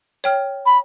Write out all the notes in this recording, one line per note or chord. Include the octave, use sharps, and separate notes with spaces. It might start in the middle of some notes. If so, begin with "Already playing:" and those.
C#5 G5 F6
B5